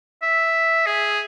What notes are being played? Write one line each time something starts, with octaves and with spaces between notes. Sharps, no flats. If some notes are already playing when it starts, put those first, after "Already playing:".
E5
G#4